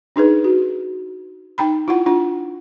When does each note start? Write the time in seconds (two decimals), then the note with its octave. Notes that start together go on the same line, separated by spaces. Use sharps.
0.16 D4 D#4 G#4 B4
0.44 F#4
1.58 D#4 G5 A#5 B5
1.88 E4 F4 F#5
2.06 D4 F4 F#5